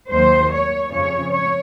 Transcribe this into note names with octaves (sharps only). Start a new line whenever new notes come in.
D#2 D#3 F#3 C5
C#5
F2 C#3 F3 C#5
C#5